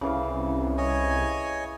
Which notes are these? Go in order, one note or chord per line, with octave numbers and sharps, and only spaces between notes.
C2 C#3 E3 F5
C#5 D#5 G#5